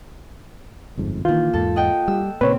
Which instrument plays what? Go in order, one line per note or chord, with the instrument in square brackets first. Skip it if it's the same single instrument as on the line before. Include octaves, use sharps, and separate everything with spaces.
[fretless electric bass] G1 F2 G#2
[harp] A#2 G6 [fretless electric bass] D#3 E3 [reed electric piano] F4
[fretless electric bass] E2 G#2 [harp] A4
[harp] D#5 F#5 G5
[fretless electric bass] G3 [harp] E6
[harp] D#2 C4 [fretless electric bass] A#2 C#3 A#3 [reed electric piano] B4 C#5